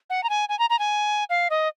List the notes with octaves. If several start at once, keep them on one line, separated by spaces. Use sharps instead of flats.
F#5
A#5
G#5
G#5
A#5
A#5
G#5
F5
D#5